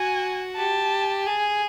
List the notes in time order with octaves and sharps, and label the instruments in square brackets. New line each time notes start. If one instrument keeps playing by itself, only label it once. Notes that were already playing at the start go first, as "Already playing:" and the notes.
Already playing: [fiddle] F#4 [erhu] G#5
[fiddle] G4 [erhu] A5
[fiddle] G#4